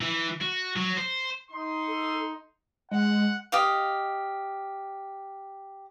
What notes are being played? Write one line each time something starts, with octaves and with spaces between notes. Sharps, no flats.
E3
F#4
F#3
C5
D#4 C6
A4
G#3 F#5
G4 D#5 F5